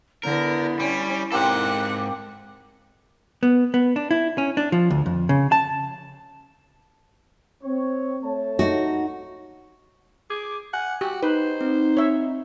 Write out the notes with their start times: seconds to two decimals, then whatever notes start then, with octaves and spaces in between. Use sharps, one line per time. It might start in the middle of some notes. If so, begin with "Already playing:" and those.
0.23 D3 B3 E4 A#4
0.80 G3 C#4 C6
1.32 G#2 A#3 C4 G4 A4 F#5
3.43 B3
3.74 B3
3.96 D4
4.11 E4
4.38 C#4
4.57 D4
4.72 F3
4.90 D2
5.06 F2
5.29 C#3
5.52 A5
7.63 C4 C#5
8.23 A3 C#5 A5
8.59 D#4 F#4
10.30 G#4 D6
10.73 F#5 G#5
11.01 F#4 G4
11.23 D#4 B4 C5
11.61 C4
11.97 C#5 E5